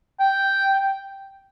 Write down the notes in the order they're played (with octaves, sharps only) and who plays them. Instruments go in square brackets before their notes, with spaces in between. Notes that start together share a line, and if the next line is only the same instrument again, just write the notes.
[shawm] G5